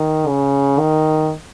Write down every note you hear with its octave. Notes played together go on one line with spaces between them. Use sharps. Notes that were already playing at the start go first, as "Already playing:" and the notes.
Already playing: D#3
C#3
D#3